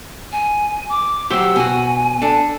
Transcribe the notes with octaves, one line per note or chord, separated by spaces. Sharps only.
G#5
D6
F#3 G4 C5 E6
B2 F#4 G#5
D4 A4